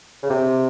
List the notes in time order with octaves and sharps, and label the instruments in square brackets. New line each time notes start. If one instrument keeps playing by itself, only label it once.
[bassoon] C#3
C3